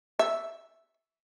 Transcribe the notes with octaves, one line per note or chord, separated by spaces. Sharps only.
E5